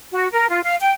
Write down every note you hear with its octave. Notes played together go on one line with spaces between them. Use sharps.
F#4
A#4
F4
F5
G5